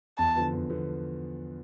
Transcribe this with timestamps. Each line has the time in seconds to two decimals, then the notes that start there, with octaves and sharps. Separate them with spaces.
0.18 E2 A5
0.36 D3 F3 B3
0.53 E2
0.70 D3 F3 B3